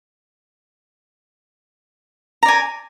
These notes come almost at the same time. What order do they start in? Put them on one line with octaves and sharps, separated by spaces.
A#5 D5 G#5